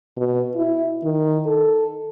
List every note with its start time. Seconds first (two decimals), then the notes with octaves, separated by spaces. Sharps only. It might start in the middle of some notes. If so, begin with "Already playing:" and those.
0.17 B2
0.56 E4
1.04 D#3
1.46 A4